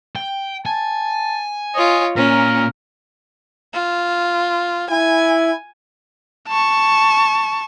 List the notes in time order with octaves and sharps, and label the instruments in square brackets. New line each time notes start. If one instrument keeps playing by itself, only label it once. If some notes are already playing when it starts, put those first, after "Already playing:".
[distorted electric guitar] G5
[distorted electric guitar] G#5 [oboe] A5
[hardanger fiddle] F4 C#5 [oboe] D#5
[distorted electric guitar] A#2 [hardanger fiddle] C#4 [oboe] A#4
[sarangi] F4
[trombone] E4 [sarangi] G#5
[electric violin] A5 C#6